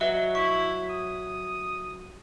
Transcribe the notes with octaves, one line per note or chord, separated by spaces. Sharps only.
F#3 B4 D#5 E5
E4 C#6
D#6